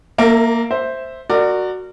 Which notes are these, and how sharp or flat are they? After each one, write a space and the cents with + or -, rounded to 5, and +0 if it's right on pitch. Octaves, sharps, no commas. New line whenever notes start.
A#3 +0 A#4 -45 E5 +0
C5 +0 E5 -5
F#4 +0 A#4 -25 D5 +20